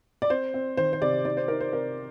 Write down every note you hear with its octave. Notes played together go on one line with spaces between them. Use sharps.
D5
C4 C5
C4
D#3 C5
C5
C3 D5
D#4 D5
C5
D#4 A#4
C5
C3 A#4